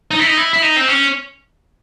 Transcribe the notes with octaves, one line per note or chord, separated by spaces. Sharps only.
D#4
E4
D#4
E4
E4
D#4
C4
C#4